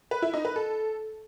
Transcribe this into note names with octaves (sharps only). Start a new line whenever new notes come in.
B4
E4
D#4
B4
A4